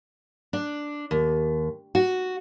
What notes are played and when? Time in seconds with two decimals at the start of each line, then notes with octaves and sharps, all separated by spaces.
0.53 D4
1.11 D#2
1.95 F#4